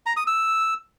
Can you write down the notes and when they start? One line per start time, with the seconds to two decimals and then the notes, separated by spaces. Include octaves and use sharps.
0.06 A#5
0.17 D#6
0.27 E6